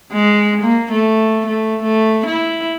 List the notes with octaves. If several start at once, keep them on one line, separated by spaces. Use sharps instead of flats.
G#3
A#3
A3
A3
A3
E4